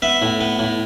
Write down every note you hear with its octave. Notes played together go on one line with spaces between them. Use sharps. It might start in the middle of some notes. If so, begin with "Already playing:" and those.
B3 E5
A2
B3
A2